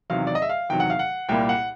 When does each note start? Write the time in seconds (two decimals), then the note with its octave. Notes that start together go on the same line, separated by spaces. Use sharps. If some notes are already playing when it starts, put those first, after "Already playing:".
0.10 E2 C3 D#3 F#3 F5
0.27 D5
0.35 D#5
0.42 E5
0.49 F5
0.69 E2 C3 D#3 F#3 G5
0.80 F#5
0.90 F5
0.99 F#5
1.29 C2 A#2 G3 A#3 G5
1.49 F#5